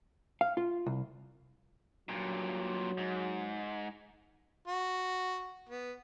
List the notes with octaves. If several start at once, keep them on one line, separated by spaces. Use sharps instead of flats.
F5
F4
C2
G2 A#2 F#3
G#2
F#4
B3